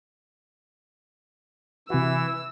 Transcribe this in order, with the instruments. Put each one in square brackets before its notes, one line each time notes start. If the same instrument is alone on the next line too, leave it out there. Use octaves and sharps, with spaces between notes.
[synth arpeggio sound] C3 F#4 [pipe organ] E3 [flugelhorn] E4 [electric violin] E6